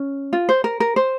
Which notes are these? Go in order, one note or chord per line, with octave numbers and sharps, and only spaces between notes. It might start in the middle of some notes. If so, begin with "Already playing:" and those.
Already playing: C#4
F4
C5
A#4
A#4
C5